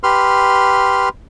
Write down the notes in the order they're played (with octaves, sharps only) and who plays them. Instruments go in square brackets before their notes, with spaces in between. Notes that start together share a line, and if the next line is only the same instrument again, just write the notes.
[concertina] G4 B4 C6 F6